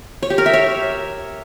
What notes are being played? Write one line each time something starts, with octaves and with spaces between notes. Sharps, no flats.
C#5
G4
A#4
E5
C#5